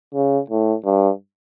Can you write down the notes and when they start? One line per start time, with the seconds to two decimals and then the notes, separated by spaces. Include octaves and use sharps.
0.14 C#3
0.50 A2
0.85 G2